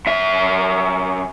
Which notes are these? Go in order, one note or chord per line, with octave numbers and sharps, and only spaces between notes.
F#2 E5